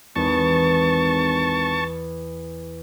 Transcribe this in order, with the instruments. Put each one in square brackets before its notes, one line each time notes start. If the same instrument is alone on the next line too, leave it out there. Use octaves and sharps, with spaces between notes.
[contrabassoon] G#1 [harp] E2 [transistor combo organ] A5 C#6